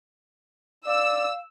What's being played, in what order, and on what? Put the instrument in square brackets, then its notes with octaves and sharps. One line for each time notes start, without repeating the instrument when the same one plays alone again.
[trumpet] D5 [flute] F5 [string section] E6